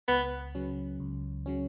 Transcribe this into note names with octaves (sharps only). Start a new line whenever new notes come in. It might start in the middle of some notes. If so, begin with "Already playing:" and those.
C#2 B3
C#3 F#3 C#4
C#2
C#3 F#3 C#4